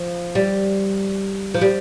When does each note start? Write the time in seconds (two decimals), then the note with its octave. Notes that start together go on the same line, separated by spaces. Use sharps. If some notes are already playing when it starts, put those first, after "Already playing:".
Already playing: F3
0.35 G3
1.54 F3
1.61 G3